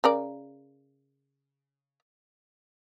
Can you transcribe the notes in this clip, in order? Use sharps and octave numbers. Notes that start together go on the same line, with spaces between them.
C#3 A#4 D5